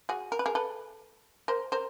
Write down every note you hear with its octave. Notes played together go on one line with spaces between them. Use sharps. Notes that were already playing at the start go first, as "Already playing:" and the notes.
F#4 G#4
A#4
B4
G#4 A#4
A4 B4
A#4 C5
A#4 C5